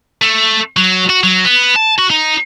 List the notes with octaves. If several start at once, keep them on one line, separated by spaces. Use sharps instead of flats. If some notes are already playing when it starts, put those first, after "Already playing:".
A3
F#3
F#4
F#3
B3
A5
F#4
D#4